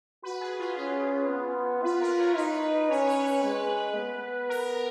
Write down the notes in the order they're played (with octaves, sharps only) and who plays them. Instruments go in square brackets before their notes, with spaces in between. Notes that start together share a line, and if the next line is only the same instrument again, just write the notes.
[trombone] F#4 [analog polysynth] B4
[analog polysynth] G#4
F4
[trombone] C#4 [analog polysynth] F4
[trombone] B3
[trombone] F4 [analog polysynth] B4
[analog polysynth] A#4
C#5
[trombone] D#4 [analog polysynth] B4
[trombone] C#4 [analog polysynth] C#5
[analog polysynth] B4
B4
[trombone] G#3
B3
[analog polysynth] A#4